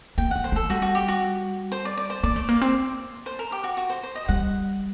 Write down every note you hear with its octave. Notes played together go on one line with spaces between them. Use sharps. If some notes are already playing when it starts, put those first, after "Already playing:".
A#3 G5
A3 F#5
C5
A3 A4
G3 F#4
F#4
G4
F#4
C5
D5
D5
C5
A#3 D5
A3
A#3
C4
C5
A#4
G4
F#4
F#4
C5
C5
D#5
G5
G3 F#5